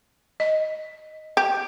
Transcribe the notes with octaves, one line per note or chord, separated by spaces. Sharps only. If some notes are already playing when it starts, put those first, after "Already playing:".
D#5
G4